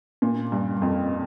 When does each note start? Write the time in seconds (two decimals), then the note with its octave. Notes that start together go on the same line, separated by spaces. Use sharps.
0.22 A#2
0.52 G2
0.82 F2